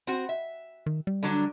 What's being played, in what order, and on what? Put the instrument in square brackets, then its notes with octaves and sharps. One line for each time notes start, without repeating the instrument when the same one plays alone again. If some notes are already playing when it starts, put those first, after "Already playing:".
[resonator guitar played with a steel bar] C4 F#4
E5
[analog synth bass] D#3
G3
[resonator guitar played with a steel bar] D3 F#3 D4